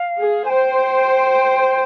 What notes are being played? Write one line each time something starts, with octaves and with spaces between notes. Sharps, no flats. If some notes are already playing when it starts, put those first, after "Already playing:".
Already playing: F5
G#4
G#5
C5 G5